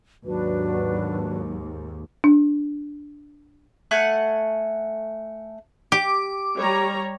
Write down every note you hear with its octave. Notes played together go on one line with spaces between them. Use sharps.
D#2 G#2 F#3 D4 F#4 B4
D4
A3 F#5 G#5
G4 D6
G3 C#5 A#5